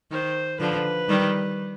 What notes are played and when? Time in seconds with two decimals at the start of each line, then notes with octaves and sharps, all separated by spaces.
0.11 D#3 C5
0.60 D3 F3 B4
1.09 D#3 G3